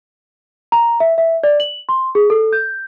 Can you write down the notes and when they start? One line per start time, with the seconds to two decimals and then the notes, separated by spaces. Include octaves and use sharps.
0.72 A#5
1.00 E5
1.18 E5
1.44 D5
1.60 F#7
1.89 C6
2.15 G#4
2.30 A4
2.53 G6